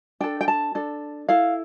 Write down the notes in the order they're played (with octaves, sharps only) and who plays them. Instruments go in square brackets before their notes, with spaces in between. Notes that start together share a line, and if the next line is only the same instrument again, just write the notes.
[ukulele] D4 A4 G5
G5
A5
D4 A4
E4 A4 F5